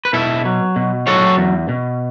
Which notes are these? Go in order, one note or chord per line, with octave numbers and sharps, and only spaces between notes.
B4
B2 E4 A4
F#3
B2
F#3 A4 C#5
E2
B2